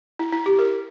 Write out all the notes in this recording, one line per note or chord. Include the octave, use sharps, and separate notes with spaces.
E4
E4
G4
A#4